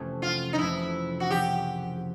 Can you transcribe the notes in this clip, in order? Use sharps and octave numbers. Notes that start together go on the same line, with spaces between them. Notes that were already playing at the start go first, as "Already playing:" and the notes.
Already playing: F2 C3 E3 A3 C#4
F4
D#4
F2 C3 E3 A3 C#4 E4
F#4
C#3 F3 A#3 G4